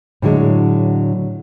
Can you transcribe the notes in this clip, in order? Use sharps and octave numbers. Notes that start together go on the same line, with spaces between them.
A2 D3 F#3 G#3